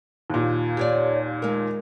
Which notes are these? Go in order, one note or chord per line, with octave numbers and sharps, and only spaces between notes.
D#2 A#2
G4 C#5 D5
G#3 A#4